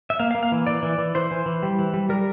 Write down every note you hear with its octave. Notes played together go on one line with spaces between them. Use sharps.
E5
A#3 F5
F5
A#3
F5
E3
E3 D5
E3
E3
E3 C5
E3
E3
G3
E3
G3
G3 A#4